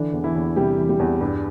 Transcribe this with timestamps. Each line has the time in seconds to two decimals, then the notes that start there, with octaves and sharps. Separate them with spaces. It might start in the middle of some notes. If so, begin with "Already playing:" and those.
Already playing: D3 E3 D4
0.13 E2
0.24 E3 E4
0.35 E2
0.56 C3 G3 G4
0.78 E3
0.89 G3 G4
1.00 E2
1.21 G2